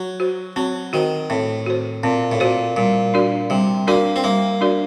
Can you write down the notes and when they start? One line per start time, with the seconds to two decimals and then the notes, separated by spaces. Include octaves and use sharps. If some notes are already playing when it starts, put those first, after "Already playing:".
Already playing: F#3
0.20 F#4 C5
0.56 F#3 C4
0.93 D#3 F#4 C5
1.30 A2 C4
1.66 F#4 C5
2.03 A#2 C4
2.32 A2
2.40 A#2 F#4 C5
2.76 A#2 G3
3.14 D4 F#4 A#4 D5
3.50 C3 G3
3.87 A#3 D4 F#4 A#4 D5
4.16 C4
4.24 G3 A#3
4.61 D4 F#4 A#4 D5